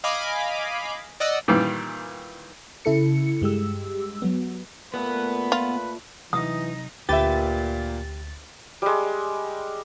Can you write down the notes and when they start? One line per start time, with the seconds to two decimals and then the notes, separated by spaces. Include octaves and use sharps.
0.04 D#5 F5 G#5 B5 D6
1.20 D5 D#5 F#5 E6
1.48 A#2 D#3 E3 G3
2.85 C#3 E4 A4 C#7
3.42 G2 G#3 G4 E6
4.22 F#3 B3
4.94 A#2 A3 B3 B4
5.52 F4
6.33 C3 E3 F#3 D#4 D#6
7.09 D2 A#2 G4 B4 E5 A6
8.82 G3 G#3